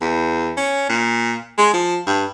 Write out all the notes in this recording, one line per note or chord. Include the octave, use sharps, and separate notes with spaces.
E2
C#4
A#2
G#3
F3
G2